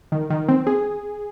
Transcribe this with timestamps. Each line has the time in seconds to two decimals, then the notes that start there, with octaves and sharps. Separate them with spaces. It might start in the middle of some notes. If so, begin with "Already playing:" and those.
0.12 D#3
0.30 D#3
0.49 C4
0.67 G#4